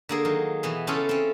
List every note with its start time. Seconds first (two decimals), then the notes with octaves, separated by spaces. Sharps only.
0.09 D3 A#3 G#4
0.25 D#3 F#3
0.63 B2 E3 B3
0.87 C#3 C#4 E4 F4 A4
1.09 C4 C#4